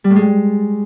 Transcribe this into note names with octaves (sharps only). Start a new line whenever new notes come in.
G3
A2
G#3